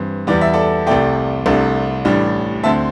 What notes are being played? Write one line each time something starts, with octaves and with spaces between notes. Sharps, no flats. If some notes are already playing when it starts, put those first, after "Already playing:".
Already playing: G2 E3 C4
E2 E3 G3 D5
E5
A4 D5
C2 C3 A3 D5 G5
C2 C3 A3 D4
A1 A2 G3 D4
D2 D3 C4 E5 A5